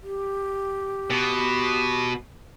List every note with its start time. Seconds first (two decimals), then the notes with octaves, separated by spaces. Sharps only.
0.02 G4
1.10 B2